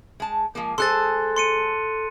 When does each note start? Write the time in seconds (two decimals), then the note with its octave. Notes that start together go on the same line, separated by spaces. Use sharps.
0.20 G#3 A5
0.55 F3 G#3 A#3
0.78 G#3 G#4 A4 C5 C6 F#6 A6
1.36 C6 C#7 D#7